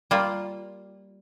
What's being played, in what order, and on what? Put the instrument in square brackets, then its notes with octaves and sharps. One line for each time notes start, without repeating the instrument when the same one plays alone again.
[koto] G3 A#3 F4